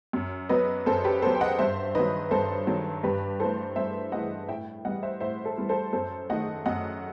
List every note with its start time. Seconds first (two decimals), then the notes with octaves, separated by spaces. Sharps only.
0.13 F#2
0.49 F#3 B3 B4 D#5
0.86 F#2 A4 C5
1.04 G4 B4
1.22 B3 A4 C5
1.27 F#3
1.35 G5
1.41 D#5 F#5
1.59 G2 C5 E5
1.95 D#3 F#3 B4 D#5
2.31 G2 A4 C5
2.67 D#3 F#3
3.03 G2 G4 B4
3.40 E3 A3 A4 C5
3.76 G2 C5 E5
4.12 E3 A3 D#5 F#5
4.49 A2 E5 G5
4.85 E3 G3 D#5 F#5
5.03 C5 E5
5.20 A2 C5 E5
5.45 A4 C5
5.57 E3 G3
5.69 A4 C5
5.93 F#2 A4 C5
6.30 D#3 A3 D#5 F#5
6.66 F#2 D#5 F#5